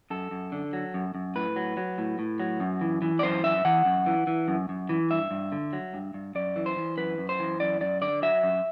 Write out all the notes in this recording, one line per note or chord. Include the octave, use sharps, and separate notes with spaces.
F#2 A4
F#2
D3
F#3
F#2
F#2
A2 B4
F#3
F#3
A2
A2
F#3
F#2
E3
E3
D5
F#2 C5
F#2 E5
E3 F#5
F#2
E3
E3
F#2
F#2
E3
G2 E5
G2
D3
F#3
G2
G2
F#2 D5
E3
C5
E3
F#2 B4
F#2
C5
E3
F#2 D5
F#2 D5
D3 D5
F#3 E5
F#2